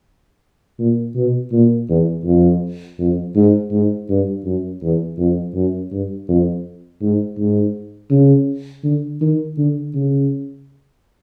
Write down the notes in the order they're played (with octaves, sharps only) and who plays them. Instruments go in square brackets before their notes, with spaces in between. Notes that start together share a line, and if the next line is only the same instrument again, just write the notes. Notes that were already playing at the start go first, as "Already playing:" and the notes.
[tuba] A#2
B2
A#2
E2
F2
F2
G#2
G#2
G2
F#2
E2
F2
F#2
G2
F2
G#2
G#2
C#3
D3
D#3
D3
C#3